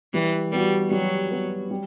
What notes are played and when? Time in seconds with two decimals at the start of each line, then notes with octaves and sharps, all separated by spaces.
0.14 E3 G3
0.52 G3 B3 F#4
0.91 F#3 G3
1.31 B3 F#4
1.71 G3